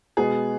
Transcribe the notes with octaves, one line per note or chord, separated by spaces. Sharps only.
B2 G#3 B3 G#4